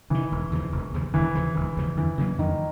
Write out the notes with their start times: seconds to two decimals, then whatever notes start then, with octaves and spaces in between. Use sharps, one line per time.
0.10 C3 D#3 E3
0.32 E1
0.51 D#2 C#3 F3
0.72 E1
0.94 D#2 C#3 F3
1.14 E1 E3
1.35 D#2 C#3 F3
1.55 E1 E3
1.77 D#2 C#3 F3
1.97 F2 E3
2.18 C#3 F#3 A#3
2.39 F2 D#3